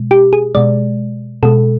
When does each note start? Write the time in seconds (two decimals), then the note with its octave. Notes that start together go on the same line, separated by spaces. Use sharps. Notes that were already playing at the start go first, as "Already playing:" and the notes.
Already playing: B2 G#3
0.11 G4
0.33 G#4
0.55 B2 G#3 D5
1.43 B2 G#3 A4